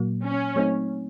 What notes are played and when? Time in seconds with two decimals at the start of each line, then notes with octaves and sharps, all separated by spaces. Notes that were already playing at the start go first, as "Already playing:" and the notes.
Already playing: A#2 F#3 A#3
0.25 C#4
0.56 F#3 A3 C4 D#4